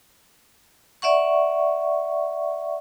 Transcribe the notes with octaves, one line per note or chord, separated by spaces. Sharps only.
D5 E5 F#5 C#6